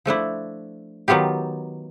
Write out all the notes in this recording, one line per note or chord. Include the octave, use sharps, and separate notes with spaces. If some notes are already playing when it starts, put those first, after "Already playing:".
F3 A3 D4 E4
D#3 F#3 B3 F4 G4